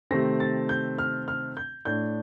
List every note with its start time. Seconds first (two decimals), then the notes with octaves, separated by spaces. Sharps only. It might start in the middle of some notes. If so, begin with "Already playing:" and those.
0.11 C3 D#3 A3 C4 A#6
0.40 A6
0.69 G6
0.98 F6
1.28 F6
1.57 G6
1.85 A2 A3 D4 G6